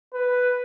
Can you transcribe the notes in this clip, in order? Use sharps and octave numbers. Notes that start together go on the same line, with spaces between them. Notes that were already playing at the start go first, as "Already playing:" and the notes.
B4